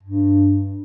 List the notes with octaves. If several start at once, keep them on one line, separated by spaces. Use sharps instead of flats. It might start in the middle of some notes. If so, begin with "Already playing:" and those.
G2